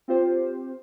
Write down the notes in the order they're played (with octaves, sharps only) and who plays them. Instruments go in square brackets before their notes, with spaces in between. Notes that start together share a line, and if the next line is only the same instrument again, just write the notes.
[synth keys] C4 F4 G4 C5